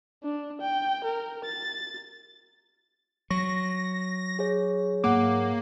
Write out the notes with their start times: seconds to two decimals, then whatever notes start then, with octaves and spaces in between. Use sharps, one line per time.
0.23 D4
0.62 G5
1.04 A#4
1.45 A6
3.30 F#3 C#6 A#6
4.39 G#4 C#5
5.04 G#2 A#3 F#5 D6